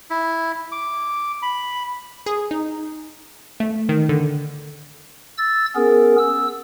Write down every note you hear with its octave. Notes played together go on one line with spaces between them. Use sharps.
E4
D6
B5
G#4
D#4
A3
D#3
D3
E6 A6
B3 C#4 G#4 A#4
E6